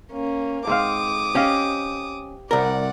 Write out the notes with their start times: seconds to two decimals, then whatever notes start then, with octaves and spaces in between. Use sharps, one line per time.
0.13 A#3 C#4
0.67 G#2 C4 F5 D6 D#6
1.35 C#4 G4 D#5 F5
2.51 C2 A#4 D5 F#5